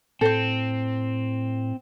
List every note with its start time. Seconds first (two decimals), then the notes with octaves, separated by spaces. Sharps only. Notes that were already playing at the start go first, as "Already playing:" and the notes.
0.21 A2 C4 A4 C5